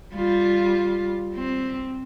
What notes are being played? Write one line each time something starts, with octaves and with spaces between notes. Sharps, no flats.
G3 F4
C4